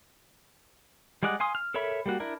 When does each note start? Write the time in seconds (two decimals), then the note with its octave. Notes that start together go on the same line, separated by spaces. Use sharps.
1.23 G3 G#3 D5 D#5 F#5
1.40 F5 G#5 C6 D#6
1.55 F6
1.74 A4 A#4 C#5 E5 B5
2.06 G3 A#3 F#4
2.20 D4 E4 A#4